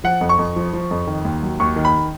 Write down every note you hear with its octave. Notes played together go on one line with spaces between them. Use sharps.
F3 F#5
F2
C#6
F2
F3
F3
F2
D#3
D#2
F#3
D#2 C#6
D#3
B5